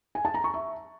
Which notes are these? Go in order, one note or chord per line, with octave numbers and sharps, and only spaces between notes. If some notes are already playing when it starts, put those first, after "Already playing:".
G#5
A5
A#5
C#6
E5